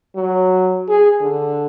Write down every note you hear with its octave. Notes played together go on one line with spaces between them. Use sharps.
F#3
G#4
D3